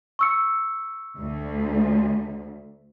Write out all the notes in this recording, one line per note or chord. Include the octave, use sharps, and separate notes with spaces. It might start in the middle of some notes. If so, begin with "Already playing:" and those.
C#6 E6 C#7
D2